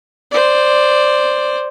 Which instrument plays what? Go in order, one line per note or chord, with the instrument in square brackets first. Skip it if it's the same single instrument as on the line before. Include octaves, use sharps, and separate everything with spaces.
[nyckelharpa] C5 D5